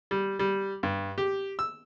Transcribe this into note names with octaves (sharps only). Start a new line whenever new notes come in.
G3
G3
G2
G4
E6